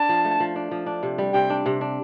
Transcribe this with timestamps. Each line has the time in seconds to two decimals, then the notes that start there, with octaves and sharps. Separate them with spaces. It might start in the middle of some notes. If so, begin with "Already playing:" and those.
Already playing: D4 A5
0.09 F3
0.25 A3
0.40 F3
0.56 D4
0.71 F3
0.86 D4
1.03 C3
1.18 G3
1.34 C3 G5
1.50 D4
1.66 C3
1.81 D4